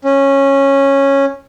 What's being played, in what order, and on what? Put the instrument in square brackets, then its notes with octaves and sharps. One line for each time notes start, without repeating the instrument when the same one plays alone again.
[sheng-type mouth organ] C#4